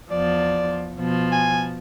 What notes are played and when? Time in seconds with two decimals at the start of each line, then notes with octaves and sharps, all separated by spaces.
0.11 E2 F3 D5
0.96 B2 F3
1.32 G#5